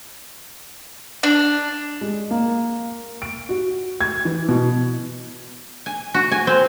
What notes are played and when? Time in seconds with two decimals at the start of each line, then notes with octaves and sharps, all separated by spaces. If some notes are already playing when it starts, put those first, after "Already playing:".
1.23 D4
2.01 G#3
2.31 A#3
3.22 D7
3.49 F#4
4.01 G#6
4.25 E3
4.49 B2
5.86 G#5
6.14 F#4
6.32 G#5
6.47 C4